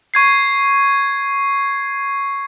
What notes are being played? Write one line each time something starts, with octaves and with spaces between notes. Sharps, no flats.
C#6 G#6 C7